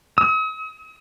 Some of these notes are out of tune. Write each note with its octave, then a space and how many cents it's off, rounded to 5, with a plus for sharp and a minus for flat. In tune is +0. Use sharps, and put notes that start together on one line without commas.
D#6 +45